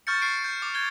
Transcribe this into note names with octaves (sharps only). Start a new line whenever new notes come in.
C#6 F6 G6 A6 C#7
F6 C7 D7
G6
D6
G6 G#6 G7